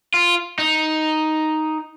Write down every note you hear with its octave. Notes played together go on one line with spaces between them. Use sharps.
F4
D#4